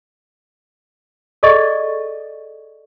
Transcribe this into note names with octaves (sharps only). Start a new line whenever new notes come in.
G#4 A4 D5 D#5 C#6